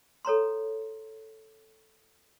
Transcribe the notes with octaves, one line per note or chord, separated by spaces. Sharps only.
A4 C#5 A#5 C6